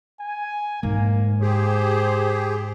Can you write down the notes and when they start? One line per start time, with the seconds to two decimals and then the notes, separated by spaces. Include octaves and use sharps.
0.20 G#5
0.83 G#2 A#3
1.41 G4 G#4 C5